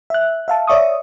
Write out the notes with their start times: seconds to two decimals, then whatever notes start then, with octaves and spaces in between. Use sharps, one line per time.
0.10 E5 F#6
0.48 E5 F5 A5
0.67 C#5 D5 E5 C#6 D#6